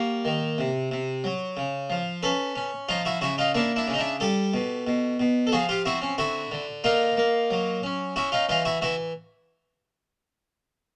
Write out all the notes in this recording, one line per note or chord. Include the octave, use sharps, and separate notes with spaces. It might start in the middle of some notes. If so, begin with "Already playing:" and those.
Already playing: G3 A#3 F#4
D#3
C3
C3
F#3
C#3
F3
C#4 A4 B4
C#4
F3 D#4 F4
E4 F#4
C#3 E4 F#4
D#4 F4
A#3 D4 E4
D4 E4
C#3
D#4
D4 E4
G3 G4 A4
B2
B2
B2
A4
F3 F#4 G#4
F4 G4
C4 E4 F#4
C#4
D3 E4 F#4
D3
A#3 D#4 F4
A#3
F#3
C#4
C#4 E4 F#4
D#4 F4
E3 D#4 F4
E4 F#4
E3 E4 F#4